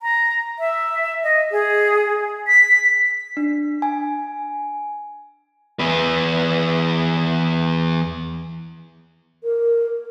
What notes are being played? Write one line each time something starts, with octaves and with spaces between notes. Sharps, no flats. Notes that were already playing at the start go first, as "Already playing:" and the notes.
A#5
E5
D#5
G#4
B6
D4
G#5
E2 B4
A#4